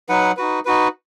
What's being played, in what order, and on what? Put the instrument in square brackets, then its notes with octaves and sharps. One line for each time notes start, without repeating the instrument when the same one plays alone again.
[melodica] F#3 D#4 B4 F#5
D#4 F#4 B4
D#4 F#4 B4